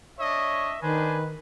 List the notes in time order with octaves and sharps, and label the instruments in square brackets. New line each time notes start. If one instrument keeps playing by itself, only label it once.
[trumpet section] D4 D#5 E5 [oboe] C#5
[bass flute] D#3 [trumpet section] D4 C5 G#5 [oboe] B4